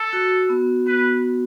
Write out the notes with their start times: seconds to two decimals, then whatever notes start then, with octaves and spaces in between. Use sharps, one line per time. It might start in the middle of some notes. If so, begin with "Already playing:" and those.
Already playing: A4
0.13 F#4
0.49 B3
0.87 B3 B4